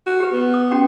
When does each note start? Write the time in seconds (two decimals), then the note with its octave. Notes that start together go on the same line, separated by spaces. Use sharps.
0.06 F#4
0.20 G4 B4
0.32 B3
0.54 D#6
0.71 C#4 F#4 G5